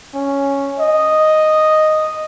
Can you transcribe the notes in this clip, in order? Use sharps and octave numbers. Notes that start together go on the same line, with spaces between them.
C#4
D#5